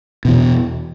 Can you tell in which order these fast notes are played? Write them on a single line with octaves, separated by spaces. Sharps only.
B2 E3 E2